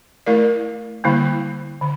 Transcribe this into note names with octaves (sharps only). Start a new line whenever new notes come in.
A3 E4 A#4 D5
D3 G3 A#3 E4
D3